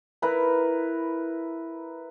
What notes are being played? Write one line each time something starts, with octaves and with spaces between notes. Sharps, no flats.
E4 A#4 B4 A#5